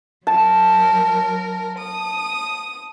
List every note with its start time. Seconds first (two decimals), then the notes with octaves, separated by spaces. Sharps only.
0.27 F#3 A#4 A5
1.78 D#6